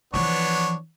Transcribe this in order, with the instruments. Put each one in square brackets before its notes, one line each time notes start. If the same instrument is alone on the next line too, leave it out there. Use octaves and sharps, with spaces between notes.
[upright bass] E3 F3 [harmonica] B3 D4 C#5